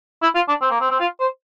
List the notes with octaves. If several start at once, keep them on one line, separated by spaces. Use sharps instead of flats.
E4
F4
D4
C4
A#3
C4
C4
F4
C5